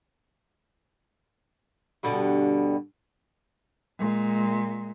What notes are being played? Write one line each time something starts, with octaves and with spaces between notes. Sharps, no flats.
G2 B2 D3
A#2 G#3